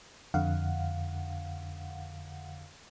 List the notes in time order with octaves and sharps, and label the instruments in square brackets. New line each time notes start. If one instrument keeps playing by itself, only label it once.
[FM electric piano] F2 D3 F5 F#5